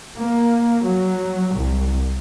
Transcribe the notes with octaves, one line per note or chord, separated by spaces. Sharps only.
A#3
F#3
C2